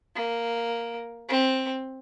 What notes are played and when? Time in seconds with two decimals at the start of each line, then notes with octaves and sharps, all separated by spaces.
0.15 A#3
1.29 C4